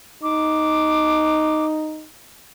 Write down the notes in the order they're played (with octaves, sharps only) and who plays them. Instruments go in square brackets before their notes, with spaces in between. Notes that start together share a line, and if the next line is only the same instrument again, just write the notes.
[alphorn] D#4 [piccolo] D6